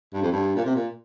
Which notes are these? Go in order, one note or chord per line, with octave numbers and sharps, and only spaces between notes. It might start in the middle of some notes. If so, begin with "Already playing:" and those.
G2
F2
G2
A#2
C3
A#2